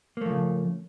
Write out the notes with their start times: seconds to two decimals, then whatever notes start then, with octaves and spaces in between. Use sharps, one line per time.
0.17 A#3
0.21 A3
0.26 F3
0.30 C#3